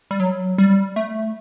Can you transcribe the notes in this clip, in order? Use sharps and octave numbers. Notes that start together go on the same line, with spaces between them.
G3
F#3
G3
A3